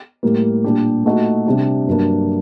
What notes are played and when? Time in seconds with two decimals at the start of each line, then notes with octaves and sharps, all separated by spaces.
0.23 A2 G3 A#3
0.64 A#2 G3 D4 G4
1.04 A#2 A3 D#4 F#4
1.46 C3 G3 D4 G4
1.87 G2 F#3 A#3 D4